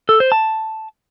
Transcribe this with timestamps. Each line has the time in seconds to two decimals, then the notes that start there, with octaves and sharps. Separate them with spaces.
0.09 A4
0.20 C5
0.32 A5